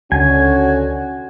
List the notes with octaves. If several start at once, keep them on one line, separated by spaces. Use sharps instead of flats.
C#2 D3 C#4 F#4 G#5